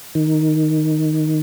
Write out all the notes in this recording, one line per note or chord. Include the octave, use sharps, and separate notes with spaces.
D#3